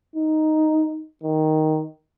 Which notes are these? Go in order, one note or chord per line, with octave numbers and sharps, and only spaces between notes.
D#4
D#3